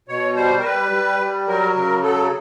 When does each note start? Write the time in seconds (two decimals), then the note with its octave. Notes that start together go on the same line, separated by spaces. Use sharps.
0.08 B2 C#5
0.36 G3 C5
0.60 A#4
0.64 G3 B4
0.92 G3
1.20 G3
1.47 F#3 A#4
1.76 C#3 A#4
2.03 F#3 A4